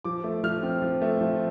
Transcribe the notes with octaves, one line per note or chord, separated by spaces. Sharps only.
F3 D6
A3
F3 F6
C4
F3
A3
F3